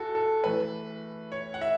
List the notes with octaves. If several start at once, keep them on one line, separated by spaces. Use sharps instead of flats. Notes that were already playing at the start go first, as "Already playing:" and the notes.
Already playing: E2 F#4 A4
A4
A2 E3 B4
C#5
F#5
E5